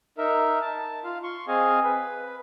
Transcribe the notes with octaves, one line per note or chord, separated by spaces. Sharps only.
D#4 A#4 E5
A5
F4 F5
C6 C#6
C4 G#4 D#5 F5 G#5
B4